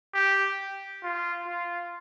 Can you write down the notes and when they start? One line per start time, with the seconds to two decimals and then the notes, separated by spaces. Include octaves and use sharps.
0.14 G4
1.03 F4
1.47 F4